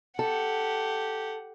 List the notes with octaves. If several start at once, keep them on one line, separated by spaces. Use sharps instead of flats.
G4 A4 F#5